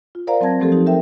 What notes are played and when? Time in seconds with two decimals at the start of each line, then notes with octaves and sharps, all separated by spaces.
0.15 F4
0.27 A#4 C5 D5 F5 F#5 A#5
0.41 F#3 C4 F#5 A5 G#6 A#6
0.60 F3 A3 C4 G4 A4
0.72 F3 D#4 G4
0.86 G4 A#4 C5 E5 G5